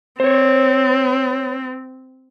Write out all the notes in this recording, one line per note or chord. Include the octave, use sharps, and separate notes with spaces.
C4 C5 C#5